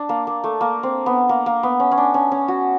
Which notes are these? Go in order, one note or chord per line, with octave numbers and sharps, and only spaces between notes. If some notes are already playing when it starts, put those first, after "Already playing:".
Already playing: D4
A#3
A#3
A3
A#3
C4
B3
A#3
A#3
B3
C#4
C#4
D4
C#4
C#4
F#4